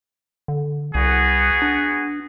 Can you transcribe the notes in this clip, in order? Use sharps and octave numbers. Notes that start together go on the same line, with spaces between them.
D3
C2 B3 F#4 G#4
D4